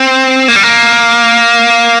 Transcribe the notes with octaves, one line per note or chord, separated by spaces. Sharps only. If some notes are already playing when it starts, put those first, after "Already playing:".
Already playing: C4
A#3
G3
A#3